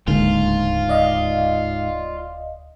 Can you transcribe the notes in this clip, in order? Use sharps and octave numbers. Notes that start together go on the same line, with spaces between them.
D1 C#2 G#2 D3 G#3 A#3 F4
D5 D#5 F5